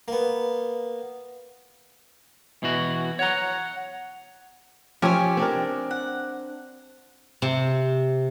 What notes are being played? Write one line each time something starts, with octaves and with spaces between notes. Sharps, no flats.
A#3 B3
B2 E3 F#4
C#5 F#5 A#5
F3 C#4 G4 C#5 E5 G#5
C4 D4 A#4
F#5
C3